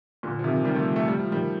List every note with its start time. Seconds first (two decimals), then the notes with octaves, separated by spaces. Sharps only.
0.23 A#2 D3
0.39 F3
0.44 C3 D#3
0.64 D#3 G3
0.75 F3 A3
0.96 A3
1.08 G3
1.19 F3
1.32 D#3 G3